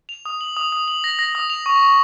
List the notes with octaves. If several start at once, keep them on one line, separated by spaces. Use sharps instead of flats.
F7
D#6
F#7
D#6
D#6
F#7
A#6
A#6
D#6
F7
C#6
C#6